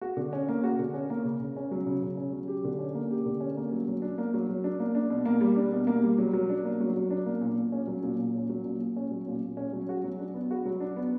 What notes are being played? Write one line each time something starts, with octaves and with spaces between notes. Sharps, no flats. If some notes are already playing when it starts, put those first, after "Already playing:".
F#4
D3
C#4
A#3
F#4
D3
C#4
A#3
C#3
C#3
C#4
F#3
C#3
C#3
C#4
F#3
G4
D3
C#4
A#3
G4
D3
C#4
A#3
F#3
F#3
D4
A#3
F#3
F#3
D4
A#3
D4
B2
A#3
G3
D4
B2
A#3
G3
F#3
F#3
D4
A#3
F#3
F#3
D4
A#3
A#2
A#2
C#4
F#3
A#2
A#2
C#4
F#3
A#2
A#2
C#4
F#3
A#2
A#2
C#4
F#3
F#4
F#3
D4
B3
F#4
F#3
D4
B3